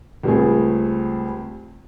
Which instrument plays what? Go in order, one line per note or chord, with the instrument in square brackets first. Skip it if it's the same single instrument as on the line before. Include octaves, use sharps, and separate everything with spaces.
[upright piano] C#2 G3 A3 C4 G#4